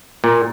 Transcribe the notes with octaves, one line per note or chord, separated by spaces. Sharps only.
A#2